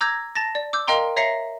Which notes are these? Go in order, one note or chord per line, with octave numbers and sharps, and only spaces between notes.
A#5 D6 E6 G6 G#6 A#6
A5 A6 A#6
D5
D6 E6 G6
A#4 D#5 F5 G5 A#5 C6
C#5 E5 A#5 A#6 C7 C#7